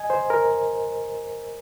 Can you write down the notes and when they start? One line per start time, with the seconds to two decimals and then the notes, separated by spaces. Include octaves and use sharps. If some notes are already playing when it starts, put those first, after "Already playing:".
Already playing: D#5 G#5
0.10 C5
0.30 A#4